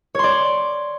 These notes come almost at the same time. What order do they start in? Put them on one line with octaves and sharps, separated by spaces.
C#5 C6 D5